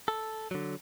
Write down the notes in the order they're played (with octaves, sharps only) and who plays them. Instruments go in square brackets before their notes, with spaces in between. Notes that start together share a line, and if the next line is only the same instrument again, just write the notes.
[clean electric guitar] A4
D3 F#3